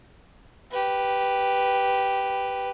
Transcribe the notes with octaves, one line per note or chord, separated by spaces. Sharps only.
G4 B4